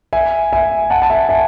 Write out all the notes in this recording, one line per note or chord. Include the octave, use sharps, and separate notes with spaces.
E5 G#5
E5 G#5
F#5 A5
A5
E5 G#5
E5 G#5